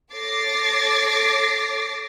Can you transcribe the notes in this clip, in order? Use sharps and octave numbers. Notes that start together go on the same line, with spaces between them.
A4 C#5 D6 A6 A#6 C7